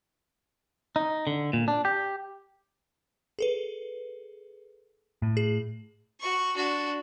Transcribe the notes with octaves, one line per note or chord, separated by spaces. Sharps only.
D#4
D3
A#2
D4
G4
G#4 A4 B4
A2
G#4
F#4 C#6
D4 F#4